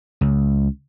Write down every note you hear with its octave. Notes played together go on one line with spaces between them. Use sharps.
C#2